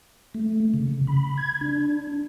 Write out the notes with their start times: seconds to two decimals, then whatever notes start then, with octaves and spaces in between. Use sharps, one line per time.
0.34 A3
0.74 C#3
1.07 B5
1.38 G#6
1.61 D4